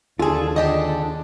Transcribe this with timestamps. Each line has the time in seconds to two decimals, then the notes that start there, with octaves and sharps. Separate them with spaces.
0.19 D#2 D3 F4 G#4 A4
0.56 D3 D4 G4 D#5